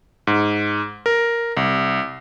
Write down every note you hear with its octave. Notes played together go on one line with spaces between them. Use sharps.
G#2
A#4
C2